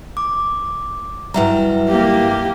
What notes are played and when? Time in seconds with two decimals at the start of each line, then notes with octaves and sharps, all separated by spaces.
0.17 D6
1.34 G2 F#3 G3 E4 E5 A#5
1.89 A#3 G4